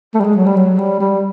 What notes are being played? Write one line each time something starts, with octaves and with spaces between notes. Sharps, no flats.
A3
G3
G#3
F#3
G3
F#3
G3
G3